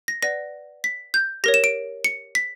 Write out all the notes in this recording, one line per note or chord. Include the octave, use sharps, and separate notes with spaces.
A#6
B4 D5 F#5 A#6
B6
G6
G4 A#4 C#5 A#6
E7
D7
C#7
B6